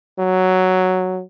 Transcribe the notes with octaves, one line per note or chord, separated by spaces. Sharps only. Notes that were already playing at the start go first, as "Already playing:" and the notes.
F#3